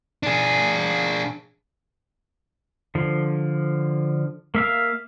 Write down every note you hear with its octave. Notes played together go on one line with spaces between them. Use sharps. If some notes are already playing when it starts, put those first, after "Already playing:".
D4 G#4
D3 F3
A#3 E5 F5